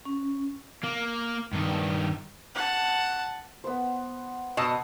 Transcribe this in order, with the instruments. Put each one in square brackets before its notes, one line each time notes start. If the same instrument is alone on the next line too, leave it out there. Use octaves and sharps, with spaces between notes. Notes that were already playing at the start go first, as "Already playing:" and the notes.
[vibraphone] C#4
[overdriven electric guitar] A#3
G2 D#3
[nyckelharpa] F#5 A5
[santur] B3 C5
[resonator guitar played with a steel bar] B2 D#5 A5 [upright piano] C#6 D#6 E6